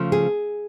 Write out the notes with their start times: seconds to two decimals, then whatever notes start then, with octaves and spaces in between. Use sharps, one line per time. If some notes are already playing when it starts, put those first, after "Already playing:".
Already playing: C#3 F3 A3
0.12 G#4